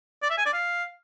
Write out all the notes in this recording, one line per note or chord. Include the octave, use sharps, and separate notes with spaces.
D5
E5
G#5
D5
F5